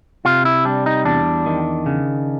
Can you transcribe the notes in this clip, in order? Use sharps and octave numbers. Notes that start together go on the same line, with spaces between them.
C3 F4
E4
G3 D4
D#4
E2 D4
D#3
C#3